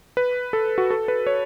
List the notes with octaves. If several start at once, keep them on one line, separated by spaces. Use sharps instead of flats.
B4
A4
F#4
A4
B4
C#5